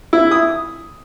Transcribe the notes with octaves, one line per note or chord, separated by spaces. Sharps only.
E4
D#6